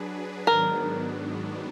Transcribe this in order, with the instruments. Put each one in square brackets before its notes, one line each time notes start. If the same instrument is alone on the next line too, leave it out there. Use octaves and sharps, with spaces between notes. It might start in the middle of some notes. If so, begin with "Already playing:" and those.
Already playing: [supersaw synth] F#3 D4 G#4 B4
[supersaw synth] G#2 D#3 F#3 B3 D4 [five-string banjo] A#4